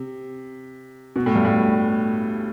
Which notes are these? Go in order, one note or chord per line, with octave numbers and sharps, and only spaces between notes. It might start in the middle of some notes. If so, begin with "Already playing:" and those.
Already playing: C3
B2
A2
G2
A2